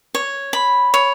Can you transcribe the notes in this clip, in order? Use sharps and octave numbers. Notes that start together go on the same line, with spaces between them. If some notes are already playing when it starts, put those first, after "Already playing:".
C#5
B5
C#5